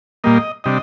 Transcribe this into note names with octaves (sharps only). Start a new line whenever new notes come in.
A#2 G3 A#3 D#5
C3 G3 D4 D#5